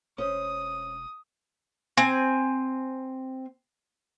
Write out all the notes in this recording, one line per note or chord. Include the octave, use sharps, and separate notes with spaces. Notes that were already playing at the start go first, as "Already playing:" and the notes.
E1 C#4 C5 D#6
C4 G#5